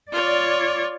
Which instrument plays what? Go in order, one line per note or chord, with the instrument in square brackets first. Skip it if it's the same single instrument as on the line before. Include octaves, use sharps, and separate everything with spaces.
[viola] F4 C#5 [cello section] D5